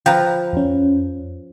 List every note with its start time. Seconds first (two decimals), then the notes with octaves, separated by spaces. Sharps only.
0.06 F3 B4 G5 A#5
0.53 F2 C#4